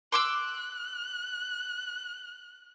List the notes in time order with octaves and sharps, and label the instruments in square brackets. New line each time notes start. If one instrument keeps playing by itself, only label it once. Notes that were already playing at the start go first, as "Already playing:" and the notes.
[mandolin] C6 D6 E6 [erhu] F#6